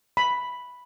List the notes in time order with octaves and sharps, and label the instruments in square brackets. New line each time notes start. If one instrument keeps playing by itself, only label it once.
[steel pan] B5